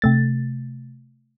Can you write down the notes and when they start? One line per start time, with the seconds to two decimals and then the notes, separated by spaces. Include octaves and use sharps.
0.02 C3 A3 A6